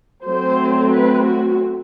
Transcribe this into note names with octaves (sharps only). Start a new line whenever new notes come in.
F#3 A3 C4 C5
B4
F#4